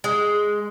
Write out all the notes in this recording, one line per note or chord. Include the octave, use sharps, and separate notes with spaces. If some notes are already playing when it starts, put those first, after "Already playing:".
G#3